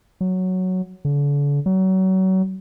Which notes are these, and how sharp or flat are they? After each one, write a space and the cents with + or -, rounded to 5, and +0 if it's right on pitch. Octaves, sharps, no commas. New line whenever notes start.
F#3 +0
D3 -40
F#3 +30